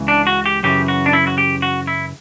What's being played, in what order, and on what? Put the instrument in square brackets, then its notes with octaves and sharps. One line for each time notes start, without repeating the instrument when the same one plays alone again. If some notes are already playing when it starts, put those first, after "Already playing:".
Already playing: [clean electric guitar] C#2 C#3 E3
D4
F#4
G4
F#2 C#3 E3 G4
F#4
D4
E4
F#4
G4
F#4
E4